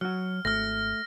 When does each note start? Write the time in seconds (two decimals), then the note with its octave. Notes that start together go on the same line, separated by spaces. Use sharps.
0.01 F#3 F#4 F6
0.45 G#1 A3 F6 A#6